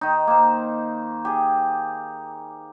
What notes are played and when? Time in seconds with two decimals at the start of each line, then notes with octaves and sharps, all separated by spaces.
0.01 D#3 D#4
0.27 A#3 C5
1.25 G4 G#4